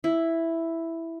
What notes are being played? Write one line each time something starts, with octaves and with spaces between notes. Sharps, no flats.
E4